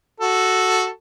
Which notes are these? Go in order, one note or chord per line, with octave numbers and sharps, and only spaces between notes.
F#4 A4